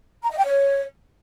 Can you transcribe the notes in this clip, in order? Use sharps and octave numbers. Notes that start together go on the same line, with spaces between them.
A#5
D#5
G5
C#5